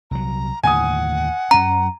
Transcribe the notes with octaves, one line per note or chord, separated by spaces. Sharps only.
C2 F#3 A#5
D#2 A2 D3 F#5 G#5 D#6
F#2 C#4 A#5